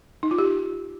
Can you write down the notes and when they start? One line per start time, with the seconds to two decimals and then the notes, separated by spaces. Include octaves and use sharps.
0.23 D#4
0.31 F4
0.38 G4